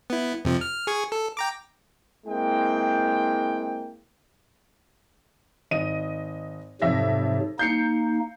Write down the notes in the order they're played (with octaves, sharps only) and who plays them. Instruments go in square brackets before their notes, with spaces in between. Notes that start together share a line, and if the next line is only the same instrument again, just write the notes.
[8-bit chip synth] B3 E4
F2 C3 F3
F6
G#4 C#6 G#6
A4
G5 A#5 D6
[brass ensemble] G#3 A#3 C4 E4 G5
[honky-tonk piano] G#1 D#5 D#7
[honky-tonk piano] F2 E5 A#6 [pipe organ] G#2 C3 F#3
[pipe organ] A#3 D#4 [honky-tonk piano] G6 C7 C#7